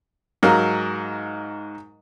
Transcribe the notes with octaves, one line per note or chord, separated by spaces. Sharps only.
G#2 F#3 A#4 F5